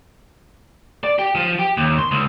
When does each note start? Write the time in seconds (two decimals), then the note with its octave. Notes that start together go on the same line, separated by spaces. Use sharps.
1.04 D5
1.19 G4
1.35 F3
1.59 G4
1.77 D#2
1.99 C6
2.11 C#2